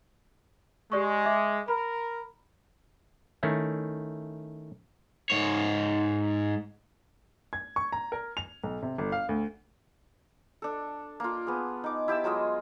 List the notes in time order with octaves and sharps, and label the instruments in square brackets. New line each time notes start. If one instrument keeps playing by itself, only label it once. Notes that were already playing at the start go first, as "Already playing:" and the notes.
[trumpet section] G#3 [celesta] G4 D5 C#6
[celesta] E5 D6
[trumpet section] A#4 [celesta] B5
[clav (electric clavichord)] D#3 A3 C#4 E4
[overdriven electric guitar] G#2 C#5
[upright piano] G#6
C#6
A#5
A#4
F7
B1
C3
G1
F5
D2
[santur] D4 A4
A#3 F4
B3 G#4
D#4 D6
E4 G4 A5 E6
F#3 G#3 F4 D#5